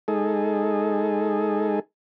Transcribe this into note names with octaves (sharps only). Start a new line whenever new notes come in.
G#3 D#4 G#4 A4